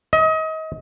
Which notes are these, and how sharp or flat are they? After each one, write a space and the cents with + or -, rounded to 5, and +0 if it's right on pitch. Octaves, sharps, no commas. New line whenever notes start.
D#5 +30